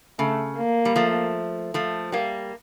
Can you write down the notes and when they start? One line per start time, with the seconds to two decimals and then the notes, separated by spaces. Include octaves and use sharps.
0.19 C#3 A3
0.58 A#3
0.85 G3
0.96 F3 A3
1.74 F3 A3
2.12 G3 A#3